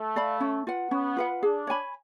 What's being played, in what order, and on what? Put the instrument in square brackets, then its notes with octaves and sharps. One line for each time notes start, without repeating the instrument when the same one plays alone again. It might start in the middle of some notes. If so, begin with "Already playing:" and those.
Already playing: [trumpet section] A3
[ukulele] D5 F5 B5
C#4
F4 B4 F#5
[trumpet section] B3 [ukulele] C#4
[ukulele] F4 B4 F#5
[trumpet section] D4 [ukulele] G#4
[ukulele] C#5 G#5 B5